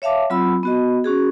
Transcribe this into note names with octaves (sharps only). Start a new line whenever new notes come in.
C#5 E5 F5 A5 D6
F#3 C4 F4 B5 E6
B3 F#4 D#5
C#4 F#4 G#4